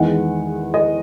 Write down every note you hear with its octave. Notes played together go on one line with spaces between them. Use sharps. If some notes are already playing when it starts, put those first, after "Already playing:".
Already playing: E2 D#3 G#3 F#5
D#5